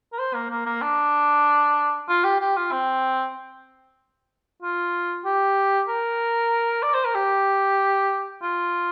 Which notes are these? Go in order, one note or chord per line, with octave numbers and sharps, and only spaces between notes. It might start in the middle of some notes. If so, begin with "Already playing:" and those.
A#4
C5
A#3
A#3
A#3
D4
F4
G4
G4
F4
C4
F4
G4
A#4
D5
C5
A#4
G4
F4